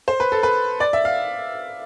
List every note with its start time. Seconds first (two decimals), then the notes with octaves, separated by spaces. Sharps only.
0.08 C5
0.20 B4
0.32 A4
0.43 B4
0.80 D5
0.93 E5
1.05 F5